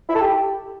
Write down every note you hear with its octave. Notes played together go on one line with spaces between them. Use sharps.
E4
A4
G4